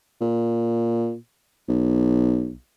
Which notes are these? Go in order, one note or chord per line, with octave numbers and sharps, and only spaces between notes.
A#2
B1